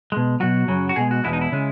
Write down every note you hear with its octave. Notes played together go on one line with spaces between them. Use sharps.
B2 G#3
B2 F#3 F#4
F#2 C#3 F#3
F#4
B2 G#3 G#4
F#4
E2 B2 G#3 E4
D#4
E4
C#3 G#3